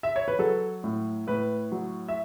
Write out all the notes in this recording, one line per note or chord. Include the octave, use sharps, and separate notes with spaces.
E5
C#5
B4
F#3 A4
A2
A2 B4
F#3
E5